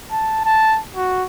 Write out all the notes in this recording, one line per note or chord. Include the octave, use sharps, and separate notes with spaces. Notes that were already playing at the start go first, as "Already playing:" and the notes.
A5
A5
F#4